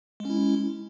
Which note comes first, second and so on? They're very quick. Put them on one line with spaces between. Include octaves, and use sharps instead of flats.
G#3 C#4 E4